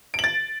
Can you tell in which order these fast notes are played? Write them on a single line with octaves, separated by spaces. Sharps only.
D7 F#7 A6